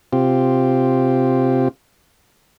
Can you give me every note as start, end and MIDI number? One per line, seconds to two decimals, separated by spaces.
0.13 1.68 48
0.13 1.68 60
0.13 1.68 65
0.13 1.68 67